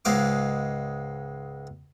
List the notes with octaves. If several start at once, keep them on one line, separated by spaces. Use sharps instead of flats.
C#2 G#2 G#3 F5 D6